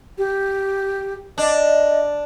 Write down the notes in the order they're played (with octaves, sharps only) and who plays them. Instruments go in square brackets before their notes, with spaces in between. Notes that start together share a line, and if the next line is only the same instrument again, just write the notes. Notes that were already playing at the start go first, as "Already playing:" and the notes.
[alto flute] G4
[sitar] D4 [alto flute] D#5